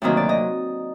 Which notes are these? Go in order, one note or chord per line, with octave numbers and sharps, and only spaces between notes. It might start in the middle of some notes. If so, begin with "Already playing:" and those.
D2 C3 D#3 F#3 A#3 D#5
D5
D#5